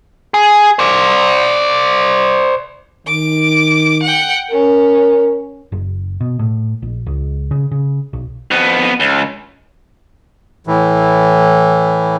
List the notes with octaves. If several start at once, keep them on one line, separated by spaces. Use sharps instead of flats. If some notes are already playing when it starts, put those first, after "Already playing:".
G#4
C5 D5
D#3 D6
F#5 G5
C#4 A#4
F#1
B2
A2
A#1
C#2
C#3
C#3
B1
F2 B3
C#2
A2 E3